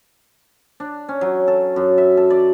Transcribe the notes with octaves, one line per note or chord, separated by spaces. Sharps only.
D4
C#4
F#3
A4
F#2
E5
A4
D5